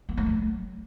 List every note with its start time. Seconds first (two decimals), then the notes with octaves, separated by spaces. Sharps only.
0.09 A#3
0.17 A3
0.26 F#3